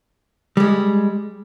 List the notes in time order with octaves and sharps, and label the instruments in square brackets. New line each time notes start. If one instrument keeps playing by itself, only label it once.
[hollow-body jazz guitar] G3 G#3